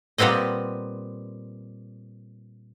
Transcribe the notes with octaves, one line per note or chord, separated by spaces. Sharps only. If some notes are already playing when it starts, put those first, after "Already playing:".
A#2 G3 B3 C4 D#5